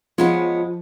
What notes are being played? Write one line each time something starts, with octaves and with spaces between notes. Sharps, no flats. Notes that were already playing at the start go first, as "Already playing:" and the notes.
F3 G#3 B3 C#4 F4